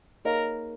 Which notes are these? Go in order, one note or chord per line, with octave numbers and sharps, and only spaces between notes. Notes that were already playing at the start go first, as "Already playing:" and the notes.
A#3 D#4 G#4 A#4 C#5